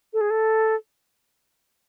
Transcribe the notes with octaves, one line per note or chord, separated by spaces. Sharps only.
A4
G#4
A4